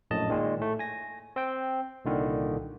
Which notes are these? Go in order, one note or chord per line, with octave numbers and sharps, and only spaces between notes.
A#1 F#2 A2 D#5 A5
A#2 D#3 G#3
A2 A3
G#5 A#6
C4 G5
C2 A#2 D3 D#3